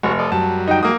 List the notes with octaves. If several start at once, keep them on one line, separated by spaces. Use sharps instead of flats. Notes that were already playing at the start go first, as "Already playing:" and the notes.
F1 G#3 F#4 C#5
A4 D5 D#5
F#2 F#3 G3 A5
D#4 G5
F#3 G#3 A#3 D#6